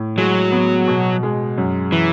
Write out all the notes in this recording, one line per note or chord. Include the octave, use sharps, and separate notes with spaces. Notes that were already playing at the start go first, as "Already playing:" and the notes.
Already playing: A2
F#3 G#3
B3
B2
G#3
F#2
E3